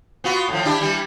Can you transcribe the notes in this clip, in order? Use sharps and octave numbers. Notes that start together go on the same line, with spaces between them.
B3 F4 F#4
A2 F3
D4 E4 G4
E3 G3